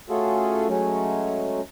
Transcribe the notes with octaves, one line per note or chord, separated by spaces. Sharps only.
A3 C#4 F4 F#4 G#4 A4
F#3 G#3 A3 C#4